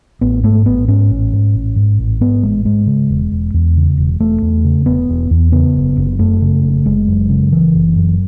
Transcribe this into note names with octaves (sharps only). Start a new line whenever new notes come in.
A1 B3
G#2 A3
A1 B3
G#2 C#4
A1
G#2
A1
G#2
A1
G#2 B3
A1 G#3
G#2 G#3
C#3
E1
E1
E2
C#3
E1
E1 A3
E2
C#3
E1 B3
E1
E2
C#3 B3
F#1
F#1
F#2 A3
C#3
F#1
F#1 G#3
F#2
C#3
F#1 E3
F#1
F#2